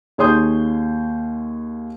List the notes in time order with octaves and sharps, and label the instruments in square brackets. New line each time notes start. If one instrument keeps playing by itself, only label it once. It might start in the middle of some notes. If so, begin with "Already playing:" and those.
[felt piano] D#2 G#4 C#5 C6 D#6 G6